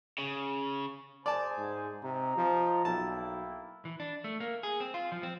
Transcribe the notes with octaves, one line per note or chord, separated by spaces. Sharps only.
C#3
G#4 C5 D5 G#5 A5
G#2
C3 D#4 A#5
F3
B1 A#3 E4 G5 A5
E3
D4
A3
A#3
G#4
C4
F4
F3
C4